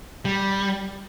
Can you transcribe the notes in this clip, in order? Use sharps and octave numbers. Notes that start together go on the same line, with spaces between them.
G3